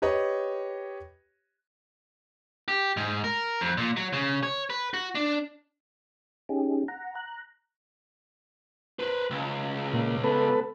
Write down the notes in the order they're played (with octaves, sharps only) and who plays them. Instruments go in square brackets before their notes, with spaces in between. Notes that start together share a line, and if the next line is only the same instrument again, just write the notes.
[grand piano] G4 B4 C#5 D#5
[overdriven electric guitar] G4
G#2
A#4
F2
A#2
F#3
C#3
C#5
B4
F#4
D4
[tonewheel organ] C#4 D#4 G4 G#4
F#5 A#5
A#5 F#6
[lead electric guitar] B4 C5
C#2
[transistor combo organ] A#2
B3 A4 B4